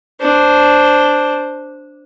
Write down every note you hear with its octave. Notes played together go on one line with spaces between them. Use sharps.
D4 C5